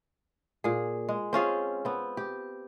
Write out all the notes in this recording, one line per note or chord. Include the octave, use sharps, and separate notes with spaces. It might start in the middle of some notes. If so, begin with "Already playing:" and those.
A#2 G#4
G#3
C4 C#4 F4 G#4
B3 C4
G4